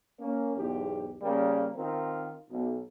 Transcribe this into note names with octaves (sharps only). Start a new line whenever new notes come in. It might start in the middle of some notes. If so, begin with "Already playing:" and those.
A#3 C#4
B1 E2 G#2 G4
C#3 G3 A#3
D#3 C4 F4 A#4
B1